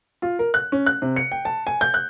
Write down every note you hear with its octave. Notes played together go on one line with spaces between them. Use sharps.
F4
A#4
F#6
C#4
F#6
C3
C#7
G5
A5
G#5
G6
F#6